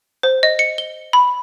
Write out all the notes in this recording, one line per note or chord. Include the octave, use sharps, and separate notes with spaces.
C5
D#5
C#7
G7
B5